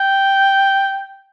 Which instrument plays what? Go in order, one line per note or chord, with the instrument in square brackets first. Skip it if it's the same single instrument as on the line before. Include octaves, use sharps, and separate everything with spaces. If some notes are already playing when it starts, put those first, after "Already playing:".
Already playing: [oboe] G5